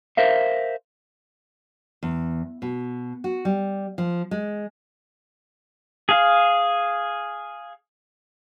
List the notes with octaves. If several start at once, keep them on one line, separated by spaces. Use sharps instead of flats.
A#4 C5 E5 F5
E2
B2
F#4
G3
F3
G#3
G#4 F5